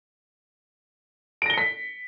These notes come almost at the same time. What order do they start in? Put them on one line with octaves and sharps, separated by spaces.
D7 A#6 G7 C#7 B6